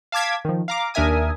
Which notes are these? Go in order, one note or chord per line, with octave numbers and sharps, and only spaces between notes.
F5 A5 D6 G#6 B6
D#3 F3
F5 A#5 D6
D#2 D4 A#4 E5 G#5 D#6